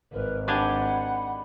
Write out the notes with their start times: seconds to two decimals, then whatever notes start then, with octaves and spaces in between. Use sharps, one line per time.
0.13 G#1 A#4 B4
0.48 D4 G4 G#4 F#5 B5